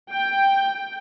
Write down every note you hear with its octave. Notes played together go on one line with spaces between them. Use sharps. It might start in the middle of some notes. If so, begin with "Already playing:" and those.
G5